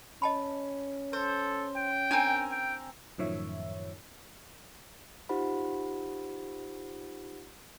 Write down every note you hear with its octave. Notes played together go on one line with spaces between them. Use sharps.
C#4 D#5 A5 B5
A4 C5
G5
C4 D4 A#4 G#5
G5
F#2 A2 D#3 F3 C#5 E5
D#4 F4 G4 C5 F#5 B5